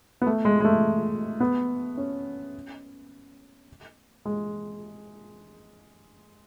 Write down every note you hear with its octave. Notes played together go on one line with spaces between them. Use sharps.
B3
A3
G#3
G#3
A3
B3
C#4
G#3